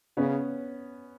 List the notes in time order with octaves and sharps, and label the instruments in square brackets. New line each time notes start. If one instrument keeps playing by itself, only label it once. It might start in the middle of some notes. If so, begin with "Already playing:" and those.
[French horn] C#3 [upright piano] B3 C#4